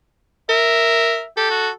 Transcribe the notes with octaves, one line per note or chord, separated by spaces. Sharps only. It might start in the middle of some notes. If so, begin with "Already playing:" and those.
A#4 E5
G4 A4
F#4